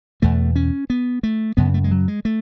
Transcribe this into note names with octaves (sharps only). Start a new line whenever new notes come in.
E2 B2 A3
C#4
B3
A3
F#2 C#3 B3
A3
G#3
F#3
G#3
A3